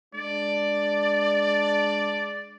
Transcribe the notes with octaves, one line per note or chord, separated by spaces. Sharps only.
G#3 D4 D5